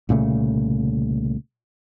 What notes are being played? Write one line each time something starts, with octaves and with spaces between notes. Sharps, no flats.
C2 A#2 C#3 A3